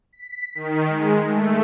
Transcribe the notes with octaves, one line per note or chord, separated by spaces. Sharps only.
B6
D#3
G#3
A3